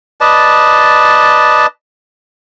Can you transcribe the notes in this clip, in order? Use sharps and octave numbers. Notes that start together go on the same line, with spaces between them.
B4 D5 D#5 A5